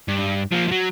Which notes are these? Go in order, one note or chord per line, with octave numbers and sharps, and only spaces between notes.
G2
F3 A#3
F3 F#3